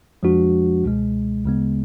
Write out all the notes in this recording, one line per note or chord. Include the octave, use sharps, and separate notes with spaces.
F2 F3 G#3 D4 F#4
C#2 B2 G#3
D2 C#3 G#3 B3